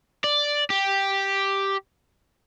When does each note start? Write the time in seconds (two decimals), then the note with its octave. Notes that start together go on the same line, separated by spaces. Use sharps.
0.24 D5
0.70 G4